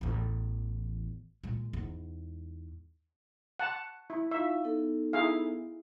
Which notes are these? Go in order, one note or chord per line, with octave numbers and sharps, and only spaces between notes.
A1 E2
A#2 G#3
E2 G#2
F#5 A5
E4
D#4 F4 E5 F5
B3 D#4 A4
E4 G#4 F5